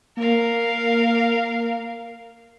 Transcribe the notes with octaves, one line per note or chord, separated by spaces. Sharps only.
A#3 A#4 F5